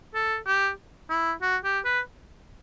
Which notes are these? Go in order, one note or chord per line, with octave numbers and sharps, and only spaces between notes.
A4
G4
E4
F#4
G4
B4